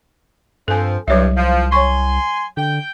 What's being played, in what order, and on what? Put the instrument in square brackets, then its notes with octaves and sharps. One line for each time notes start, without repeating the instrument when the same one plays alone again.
[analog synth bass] G2 [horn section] F3 C4 [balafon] A4 G#5
[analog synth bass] C2 [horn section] G2 [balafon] F#3 C#5 E5
[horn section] F3
[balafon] C#5 C#6 [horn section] G#5 C6
[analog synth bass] D3 [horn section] G5